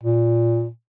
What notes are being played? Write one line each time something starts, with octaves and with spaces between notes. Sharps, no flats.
A#2